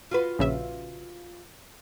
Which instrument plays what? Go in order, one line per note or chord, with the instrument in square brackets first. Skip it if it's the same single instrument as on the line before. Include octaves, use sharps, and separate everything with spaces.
[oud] F4 F#4 B4
[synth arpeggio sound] A#1 C#3 E5